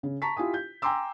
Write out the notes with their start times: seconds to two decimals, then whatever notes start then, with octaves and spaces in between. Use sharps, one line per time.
0.03 C#3
0.22 A5 A#5 C#6 B6
0.37 E4 F4 G4 G#5 D#6
0.54 G6
0.82 G5 G#5 A#5 C6 D6 E6